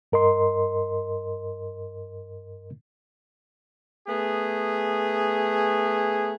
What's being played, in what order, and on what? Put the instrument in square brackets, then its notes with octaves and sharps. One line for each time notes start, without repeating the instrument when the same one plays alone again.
[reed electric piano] G2 A#4 D#5 C6
[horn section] A3 B3 G#4